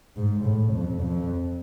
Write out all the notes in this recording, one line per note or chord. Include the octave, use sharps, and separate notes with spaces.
G#2
A2
F2
F2